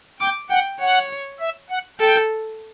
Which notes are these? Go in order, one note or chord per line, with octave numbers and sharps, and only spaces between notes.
G5 D6
F#5 G5
C#5 F#5
E5
F#5
A4 G5